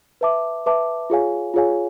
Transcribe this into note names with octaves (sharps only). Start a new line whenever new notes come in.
B4 E5 A5 D6
B4 E5 A5 D6
F4 G#4 C#5 F5 G#5
F4 G#4 C#5 F5 G#5